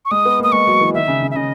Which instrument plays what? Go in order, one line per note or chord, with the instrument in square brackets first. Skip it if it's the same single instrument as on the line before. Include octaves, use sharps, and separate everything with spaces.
[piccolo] C#6
[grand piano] G#3 [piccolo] D#6
[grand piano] B3
[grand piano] A#3 [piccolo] D#6
[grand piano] G#3 [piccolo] C#6
[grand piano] F#3
E3
[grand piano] D#3 [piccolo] E5
[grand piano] C#3
C#3
[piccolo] E5
[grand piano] C#3 [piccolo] D#5